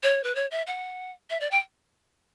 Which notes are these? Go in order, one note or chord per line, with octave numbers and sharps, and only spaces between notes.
C#5
B4
C#5
E5
F#5
E5
D5
G5